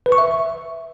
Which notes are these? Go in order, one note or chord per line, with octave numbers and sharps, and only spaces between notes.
B4
C#6
E5